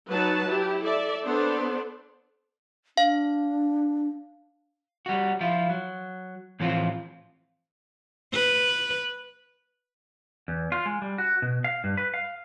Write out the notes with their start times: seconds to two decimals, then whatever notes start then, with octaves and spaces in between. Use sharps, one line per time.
0.10 F#3 D#4 F#4 B4 A5
0.48 E4 G4
0.82 A4 D5 E5
1.24 B3 D4 A4 B4 C5 D5
2.97 D4 F5
5.06 G3 F#4
5.41 F3 E4 F4
5.70 F#3
6.60 A2 E3 F3 C4 F4
8.34 B4
10.48 E2
10.72 F4
10.86 G#3
11.02 G3
11.18 F#4
11.42 B2
11.64 F5
11.84 G2
11.97 B4
12.14 F5